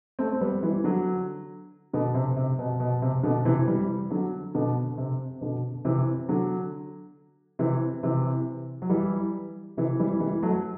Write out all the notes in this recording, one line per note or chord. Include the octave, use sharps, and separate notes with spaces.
A3 C4
C4
G3 B3
E3 G3
D3 F#3
B2 D3
C3
C3
B2
B2
C3
B2 D3
C3 E3
E3 G3
D3 F#3
B2 D3
C3
B2 D3
C3 E3
D3 F#3
C3 E3
C3 E3
F#3
E3 G3
C3 E3
E3 G3
E3 G3
F#3 A3